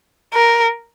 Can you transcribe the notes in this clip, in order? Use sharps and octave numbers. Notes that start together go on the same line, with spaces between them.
A#4